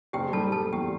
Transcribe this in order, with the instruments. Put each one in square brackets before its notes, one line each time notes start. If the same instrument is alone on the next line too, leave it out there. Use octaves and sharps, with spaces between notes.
[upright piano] F#1 [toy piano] G4 G5
[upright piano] G3 [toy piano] A4 A5
[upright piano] G3 [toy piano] A4 A5
[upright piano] E2 [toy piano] G4 G5